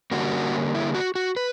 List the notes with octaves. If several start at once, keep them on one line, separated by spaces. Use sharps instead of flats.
D3 G3 A#3 C#4 F#4
E4
F#4
F#4
B4